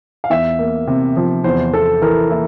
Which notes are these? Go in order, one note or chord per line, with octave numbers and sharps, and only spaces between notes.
F5
E2 E5
A#3
C3
F3
E2 C5
E2 A4
E3 A#4
A#3 E4